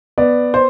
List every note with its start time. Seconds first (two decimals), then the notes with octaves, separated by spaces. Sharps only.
0.18 B3 D5
0.54 C5